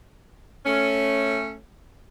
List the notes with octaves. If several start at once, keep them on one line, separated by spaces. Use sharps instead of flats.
A3 C#4